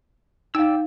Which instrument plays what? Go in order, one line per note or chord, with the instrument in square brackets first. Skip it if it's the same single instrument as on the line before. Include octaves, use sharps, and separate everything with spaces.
[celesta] D#4 F5 [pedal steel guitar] D5 G5 E6